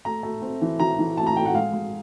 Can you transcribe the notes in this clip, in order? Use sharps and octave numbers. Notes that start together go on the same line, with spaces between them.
A3 A#5
A3
C4
E3
E3 A#5
E3
A3 A5
A#5
A3 G5
F#5
G#3 F5
G#3